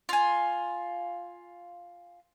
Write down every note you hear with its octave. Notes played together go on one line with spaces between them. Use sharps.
F4 G#5